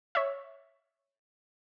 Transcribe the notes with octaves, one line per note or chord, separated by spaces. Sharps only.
C#5 E5